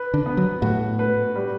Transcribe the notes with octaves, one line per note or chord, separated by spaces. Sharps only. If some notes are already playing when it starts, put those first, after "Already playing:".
Already playing: B4
D3
B3
F#3
A2 F#4
B4
G3